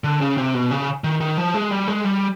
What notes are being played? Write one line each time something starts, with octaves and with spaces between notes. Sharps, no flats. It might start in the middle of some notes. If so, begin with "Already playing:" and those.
D3
C#3
C3
B2
C#3
D#3
D#3
F3
G#3
G3
G#3
G3